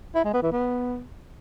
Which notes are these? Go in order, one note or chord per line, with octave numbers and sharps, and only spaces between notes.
E4
G#3
B3
E3
B3